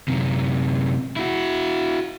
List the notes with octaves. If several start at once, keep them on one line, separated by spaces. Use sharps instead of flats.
F#2 C3
E4 F#4